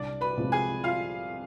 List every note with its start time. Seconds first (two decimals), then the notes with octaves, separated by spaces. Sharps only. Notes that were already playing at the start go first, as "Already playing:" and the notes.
Already playing: C2 D4 D5
0.21 B4 B5
0.37 C3 F3 G#3
0.52 G#4 G#5
0.84 F4 F5